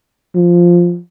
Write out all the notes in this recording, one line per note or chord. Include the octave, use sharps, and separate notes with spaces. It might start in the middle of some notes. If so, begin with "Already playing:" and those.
F3